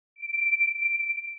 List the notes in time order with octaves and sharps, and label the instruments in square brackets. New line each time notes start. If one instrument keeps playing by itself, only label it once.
[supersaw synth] D7